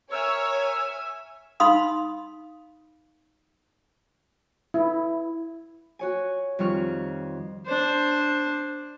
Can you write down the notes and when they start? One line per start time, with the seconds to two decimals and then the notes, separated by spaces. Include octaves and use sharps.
0.12 A#4 C#5 E5 G#5 E6
1.60 D#4 F5 B5 C6 D#6
4.74 E4
5.99 F#4 C#5 G#5
6.59 F2 D#3 G3 C#6 F6
7.66 D4 C5